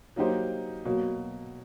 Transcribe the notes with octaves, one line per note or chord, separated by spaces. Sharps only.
F#3 A#3 D#4 G4 C5
B2 F#3 A#3